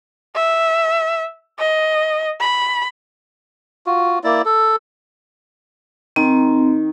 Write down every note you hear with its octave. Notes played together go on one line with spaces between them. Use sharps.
E5
D#5
B5
F4 F#4
A#3 E4 D5
A4
D#3 C4